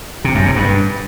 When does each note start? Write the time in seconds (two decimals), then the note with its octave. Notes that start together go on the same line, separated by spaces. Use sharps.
0.24 C3
0.35 F#2
0.46 C3
0.56 G2